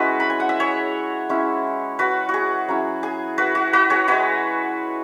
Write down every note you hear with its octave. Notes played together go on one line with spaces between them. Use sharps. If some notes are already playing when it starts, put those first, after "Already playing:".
Already playing: G#3 C#4 E4 F#4 B4
B5
G#5
F#5
E5
G#4 C#5
G#3 C#4 E4
F#4 B4
F#4
G#4
F#3 C#4 E4
G#4
F#4 B4
F#4
F#4 B4
G#4 C#5
G#3 E4 F#4 B4